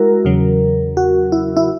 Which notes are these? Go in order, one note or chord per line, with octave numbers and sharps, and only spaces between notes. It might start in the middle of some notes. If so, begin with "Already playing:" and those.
Already playing: G#3 E4 F#4 A#4
E2 C#3 F#3
F#4
E4
E4